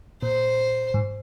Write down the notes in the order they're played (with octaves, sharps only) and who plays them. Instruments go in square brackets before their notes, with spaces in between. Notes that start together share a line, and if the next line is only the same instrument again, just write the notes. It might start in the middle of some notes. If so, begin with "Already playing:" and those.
[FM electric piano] A#2 [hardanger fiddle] C5
[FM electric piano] G#2